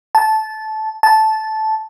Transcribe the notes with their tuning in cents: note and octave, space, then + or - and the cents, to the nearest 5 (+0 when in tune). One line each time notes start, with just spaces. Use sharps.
A5 -15
A5 -10